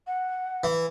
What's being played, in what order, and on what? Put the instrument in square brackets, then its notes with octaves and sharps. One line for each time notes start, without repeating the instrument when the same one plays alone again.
[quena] F#5
[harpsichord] E3